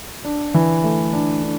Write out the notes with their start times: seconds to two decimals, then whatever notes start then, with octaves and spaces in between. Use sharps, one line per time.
0.24 D4
0.54 E3
0.84 A3
1.13 D4
1.43 D4